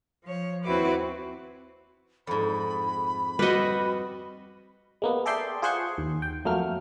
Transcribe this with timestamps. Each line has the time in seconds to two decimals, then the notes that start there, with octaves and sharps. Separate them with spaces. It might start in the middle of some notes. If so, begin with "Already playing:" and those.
0.24 F3 C#5
0.63 D#2 C4 E4 F#4 B4 D6
2.27 F2 G#2 B5
3.39 G3 F#4 B4 D#5
5.02 G#3 A#3 B3
5.26 G#4 A4 D5 E5 G5 C6
5.62 F4 G#4 C5 F#5 C6 C#6
5.98 D#2
6.22 G5
6.45 F2 F#3 A3 A#3 F6